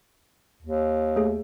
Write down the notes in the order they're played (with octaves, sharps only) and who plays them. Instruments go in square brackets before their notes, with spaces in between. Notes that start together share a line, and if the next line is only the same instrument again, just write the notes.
[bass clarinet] D#2
[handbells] A3 G#4